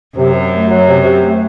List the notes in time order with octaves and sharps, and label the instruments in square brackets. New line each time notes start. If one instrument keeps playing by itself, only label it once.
[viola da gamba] F#2 [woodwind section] C3
[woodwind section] C3
A3
F#3
C3
C3
A3